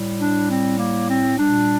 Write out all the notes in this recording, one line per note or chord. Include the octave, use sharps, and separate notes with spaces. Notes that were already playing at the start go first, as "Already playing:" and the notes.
Already playing: A2 G3
D4
C4
A#3
C4
A#2 G3 D4